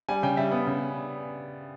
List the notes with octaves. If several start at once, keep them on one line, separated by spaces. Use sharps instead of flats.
G3 G#5
C#3 G5
G3 E5
B3
C#3